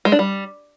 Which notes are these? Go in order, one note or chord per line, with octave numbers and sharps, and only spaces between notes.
G#3
D4
G3